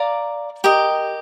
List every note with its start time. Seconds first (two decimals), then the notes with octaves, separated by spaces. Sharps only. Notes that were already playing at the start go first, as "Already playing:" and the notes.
Already playing: D5 F5 A#5 D6
0.64 G4 A#4 D#5